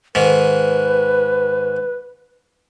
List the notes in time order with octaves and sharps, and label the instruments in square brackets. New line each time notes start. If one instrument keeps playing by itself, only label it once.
[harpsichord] G#2 D#3 [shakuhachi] B4